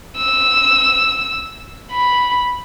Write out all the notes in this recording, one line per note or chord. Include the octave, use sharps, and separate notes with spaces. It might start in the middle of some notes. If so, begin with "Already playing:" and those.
E6
B5